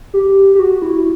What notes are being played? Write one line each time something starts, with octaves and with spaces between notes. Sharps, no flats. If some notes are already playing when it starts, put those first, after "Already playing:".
G4
G4
F#4
E4